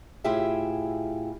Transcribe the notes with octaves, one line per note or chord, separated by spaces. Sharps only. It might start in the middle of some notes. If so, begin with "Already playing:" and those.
A2 E4 F4 G4 G#4 E5